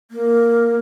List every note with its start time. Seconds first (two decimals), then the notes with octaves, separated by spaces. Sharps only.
0.11 A#3